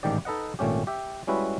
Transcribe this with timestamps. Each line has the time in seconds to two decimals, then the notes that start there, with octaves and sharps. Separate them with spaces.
0.03 A1 G#2 D#3 G4 D5
0.25 D#4 A4 B4 D#5 F#5
0.59 G#1 A#2 A3 C#4 G4
0.87 G4 E5
1.27 G3 G#3 C#4 E4 F#4 B4